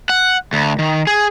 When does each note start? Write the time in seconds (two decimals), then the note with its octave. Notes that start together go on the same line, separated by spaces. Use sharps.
0.09 F#5
0.53 D2
0.79 D#3
1.07 G#4